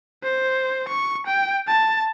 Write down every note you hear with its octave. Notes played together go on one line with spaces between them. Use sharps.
C5
C#6
G5
A5